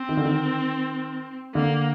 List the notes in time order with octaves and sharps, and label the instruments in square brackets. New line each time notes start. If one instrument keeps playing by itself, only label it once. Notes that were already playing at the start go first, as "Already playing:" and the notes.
Already playing: [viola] C4
[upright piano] D#3
D3
D#3
[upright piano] D3 [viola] A#3